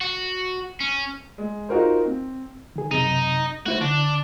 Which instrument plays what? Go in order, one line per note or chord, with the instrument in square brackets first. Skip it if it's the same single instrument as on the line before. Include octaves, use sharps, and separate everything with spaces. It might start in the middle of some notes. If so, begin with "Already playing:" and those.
[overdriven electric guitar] F#4
C#4
[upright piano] G#3
D#4 F4 F#4 A#4 C5
C4
[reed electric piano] D#3 G#4
[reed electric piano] F#2 C3 [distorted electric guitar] D#4
[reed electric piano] A3 E4 C5 [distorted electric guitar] F#4
[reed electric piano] D3 [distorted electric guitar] D4